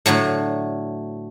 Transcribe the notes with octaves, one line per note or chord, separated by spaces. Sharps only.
A2 D3 F#3 A3